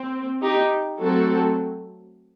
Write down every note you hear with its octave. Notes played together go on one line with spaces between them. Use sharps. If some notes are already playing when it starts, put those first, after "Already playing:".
Already playing: C4
D#4 G4
F#3 A3 C4 F#4 A4